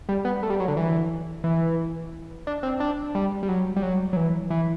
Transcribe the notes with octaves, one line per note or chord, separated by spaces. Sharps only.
G3
B3
A3
G3
F#3
D3
E3
E3
D4
C4
D4
G3
G3
F#3
G3
F#3
F#3
E3
E3